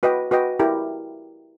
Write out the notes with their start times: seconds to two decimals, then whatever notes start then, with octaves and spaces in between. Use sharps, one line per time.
0.03 F#4 B4 D#5 G5
0.31 F#4 B4 D#5 G5
0.59 E4 G4 A#4